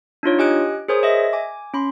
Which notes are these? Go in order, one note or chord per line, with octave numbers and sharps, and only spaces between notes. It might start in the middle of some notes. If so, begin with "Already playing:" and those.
D4 D#4 F4 C#5
G4 D#5 G#5 D#6 F#6 D7
G#4 A#4 C5 C#5 G#5 D#6
D#5 E5 A#6
G#5 D6
C#4 B5 C6